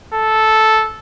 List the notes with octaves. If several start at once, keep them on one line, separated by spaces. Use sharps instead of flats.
A4